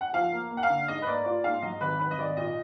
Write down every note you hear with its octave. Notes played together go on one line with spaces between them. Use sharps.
F#5
F3 F5
A#3
A#3
F#5
F5
D3
G#2 D#5
B4
A#3 D5
F4 D5
G#2 F5
F#3 D#5
G#1 B4
G#1 B4
D#5
G#1 D5
A#2 D#5